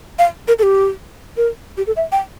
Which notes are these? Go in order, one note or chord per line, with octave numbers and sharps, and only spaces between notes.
F5
A#4
A4
G4
A#4
G4
A4
E5
G5